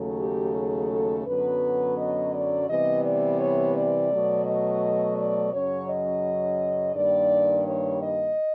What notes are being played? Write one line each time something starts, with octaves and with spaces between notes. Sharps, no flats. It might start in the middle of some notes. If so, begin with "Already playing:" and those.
Already playing: D#2 C#3 F#3 A3
G4
G#4
A4
F#2 D3 F#3 B3 B4
D#5
D5
C3 E3 G3 B3 D#5
D5
C#5
D5
B2 F#3 A3
D#5
D5
F#2 C#3 F#3 C#5
D#5
G2 D#3 G3 A#3 D5
C#5
D#5